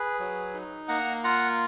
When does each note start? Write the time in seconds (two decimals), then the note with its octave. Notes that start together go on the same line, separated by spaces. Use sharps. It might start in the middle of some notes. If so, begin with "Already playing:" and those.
Already playing: G#4 B4
0.19 F#3
0.54 D#4
0.88 A#3 F#5 A#5
1.24 F4 F#5 A#5